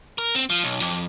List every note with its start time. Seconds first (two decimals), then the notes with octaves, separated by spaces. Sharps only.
0.18 A#4
0.35 C4
0.50 F3
0.64 B1
0.82 F2